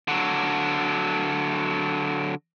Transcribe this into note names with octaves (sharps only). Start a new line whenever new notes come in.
D3 F#3